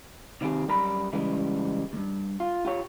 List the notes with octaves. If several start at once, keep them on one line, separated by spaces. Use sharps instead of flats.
C3 D#3 C4 G4 G#4
F#2 G3 A#4 A#5 B5
C#3 E3 G3 G#3
D2 G2
F4
F4 G4 C#5